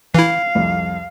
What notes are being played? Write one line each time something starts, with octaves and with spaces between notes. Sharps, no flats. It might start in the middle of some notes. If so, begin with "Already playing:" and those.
E3 E4 F5
C2 F2